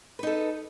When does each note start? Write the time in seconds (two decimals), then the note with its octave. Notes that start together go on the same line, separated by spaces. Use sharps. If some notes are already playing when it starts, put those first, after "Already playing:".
0.19 B4
0.23 D#4
0.27 A4